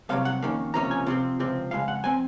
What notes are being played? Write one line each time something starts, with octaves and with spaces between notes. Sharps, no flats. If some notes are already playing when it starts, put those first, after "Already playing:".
C2 C3 F#3 F5
F#5
F2 D#3 A#3 C#4
C#2 C3 F3 A#3 C#4 A#5
G#5
C3 F3 C4
C#2 C3 F3 C4
F2 C#3 G#3 F5
F#5
F3 C4 G#5